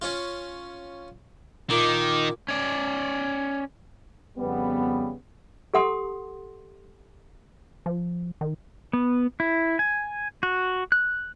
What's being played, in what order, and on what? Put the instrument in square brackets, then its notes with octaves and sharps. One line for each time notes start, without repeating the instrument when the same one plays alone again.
[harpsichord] C#4 F4
[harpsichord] A#2 [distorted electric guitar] D#3 [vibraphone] D6
[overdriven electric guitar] C#4 D5
[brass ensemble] F2 C#3 G3 B3
[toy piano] G4 A4 F#5 C6 D#6
[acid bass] F3
D#3
[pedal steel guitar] B3
E4
G#5
F#4
F#6